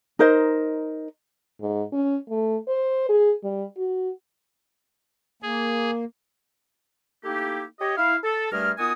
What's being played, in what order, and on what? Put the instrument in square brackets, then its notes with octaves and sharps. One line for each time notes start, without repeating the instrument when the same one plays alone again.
[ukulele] D#4 A#4 C5 D#5
[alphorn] G#2
C#4
A3
C5
G#4
G3
F#4
[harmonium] A#3 [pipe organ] G#4
[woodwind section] A3 A#3 D#4 E4 G4
G4 C#5 D#5
E4 F5
A4
G2 G3 A3 G#4 A#4 F6
D#3 B3 F4 F#4 G#5 D#6